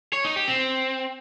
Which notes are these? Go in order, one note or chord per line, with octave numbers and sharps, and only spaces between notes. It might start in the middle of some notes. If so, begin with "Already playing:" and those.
C#5
D#4
G4
C4